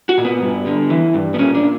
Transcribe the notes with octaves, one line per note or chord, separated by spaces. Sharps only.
F#4
A#2
B3
G2
D3
E3
G2
B3
A#2 C#4
D4
A#2